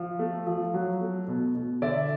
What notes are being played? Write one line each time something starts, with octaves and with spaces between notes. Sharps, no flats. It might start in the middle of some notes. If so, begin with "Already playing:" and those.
Already playing: F3
A3
F3
F#3
A3
B2
B2
D3 D5 E5